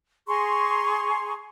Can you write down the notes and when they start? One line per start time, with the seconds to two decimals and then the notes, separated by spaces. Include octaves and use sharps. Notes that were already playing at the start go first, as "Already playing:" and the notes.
0.27 G#4 A#5 C6 C#6